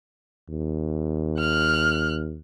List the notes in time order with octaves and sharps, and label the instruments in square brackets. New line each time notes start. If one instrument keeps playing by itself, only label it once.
[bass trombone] D#2
[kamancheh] F6 F#6